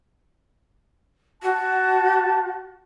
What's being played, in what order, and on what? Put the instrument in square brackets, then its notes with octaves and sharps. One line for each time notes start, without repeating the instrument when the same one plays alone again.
[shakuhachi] F#4 [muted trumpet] A5